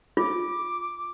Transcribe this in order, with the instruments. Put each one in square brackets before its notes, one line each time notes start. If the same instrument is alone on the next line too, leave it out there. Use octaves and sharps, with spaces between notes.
[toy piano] F4 [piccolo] D6